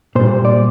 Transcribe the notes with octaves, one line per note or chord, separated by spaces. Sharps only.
A#2 G3 C5
D5